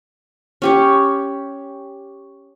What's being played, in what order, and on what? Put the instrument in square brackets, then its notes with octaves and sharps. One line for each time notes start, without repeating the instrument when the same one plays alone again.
[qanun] C#4 G4 C#5